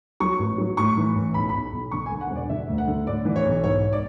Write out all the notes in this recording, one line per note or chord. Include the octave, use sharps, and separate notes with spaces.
F#3 C#6
A1
F#3
A2 C#6
E3
A1
B1 B5
B5
B1
B1
D3 C#6
G#5
D3
F#5
E1 D5
D3 E5
D2
F#5
D3
A2 D5
E3
C#5
B1
G#2 C#5
D5